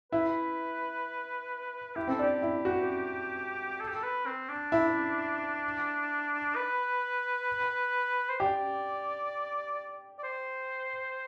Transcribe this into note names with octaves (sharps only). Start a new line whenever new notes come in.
E4 B4
E4 G4
C4 A4
D4 G4
E4
F#4
A4
G4
A4
B4
C4
D4
E4
B4
C5
G4 D5
D5
C5